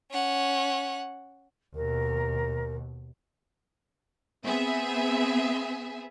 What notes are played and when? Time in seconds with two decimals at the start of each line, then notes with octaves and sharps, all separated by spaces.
0.11 C#4 F#5
1.75 D#2 B2 A#4
4.44 B3 C4 G#4 E5